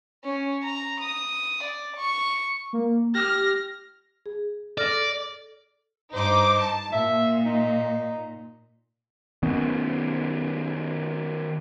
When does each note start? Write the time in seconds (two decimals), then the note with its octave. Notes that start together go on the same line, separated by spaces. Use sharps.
0.24 C#4
0.64 A#5
1.01 D#6
1.64 D5
1.97 C#6
2.73 A#3
3.14 G4 F6 A#6
4.26 G#4
4.78 A4 D5 F6 A#6
6.13 G2 D#4 C5 D6
6.59 A5
6.93 A#2 E5
7.45 D#4
9.43 D#3 B3 C#4